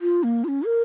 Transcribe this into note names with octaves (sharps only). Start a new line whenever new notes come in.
F4
A#3
F4
C#4
A#4